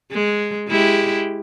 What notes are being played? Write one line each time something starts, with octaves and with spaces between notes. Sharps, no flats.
G#3
G#3 E4 G4